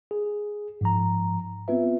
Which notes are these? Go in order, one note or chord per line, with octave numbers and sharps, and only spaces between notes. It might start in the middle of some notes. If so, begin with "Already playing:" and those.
G#4
G#2 F3 A#5
B3 C4 F4 B4 E5